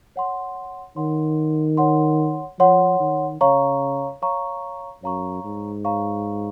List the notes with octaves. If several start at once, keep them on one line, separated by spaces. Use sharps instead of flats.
C#5 F#5 C6
D#3 C#5 F#5 C6
C#5 F#5 C6
F3 C#5 F#5 C6
D#3
C#3 C#5 F5 A#5 C#6
C#5 F5 A#5 C#6
F#2 C#5 F5 A#5 C#6
G#2
C#5 F5 A#5 C#6